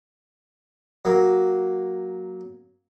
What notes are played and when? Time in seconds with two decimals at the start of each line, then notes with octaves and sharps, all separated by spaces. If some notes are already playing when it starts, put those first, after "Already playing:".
1.05 F#3 A#3